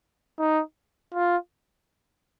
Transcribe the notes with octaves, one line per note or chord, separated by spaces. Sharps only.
D#4
F4